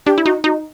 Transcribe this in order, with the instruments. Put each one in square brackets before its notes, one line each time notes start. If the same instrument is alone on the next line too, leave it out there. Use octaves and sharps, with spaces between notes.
[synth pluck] D4 [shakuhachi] G4
[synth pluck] E4
[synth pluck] D#4 [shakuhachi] F#4
[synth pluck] D#4 [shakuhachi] F#4